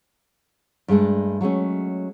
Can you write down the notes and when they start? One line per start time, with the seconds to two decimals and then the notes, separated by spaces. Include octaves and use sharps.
0.88 G2 G#3 A3 D4
1.41 F#3 G#3 A3 C#4